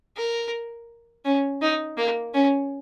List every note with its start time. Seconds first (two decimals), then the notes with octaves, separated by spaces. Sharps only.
0.16 A#4
1.25 C#4
1.61 D#4
1.97 A#3
2.34 C#4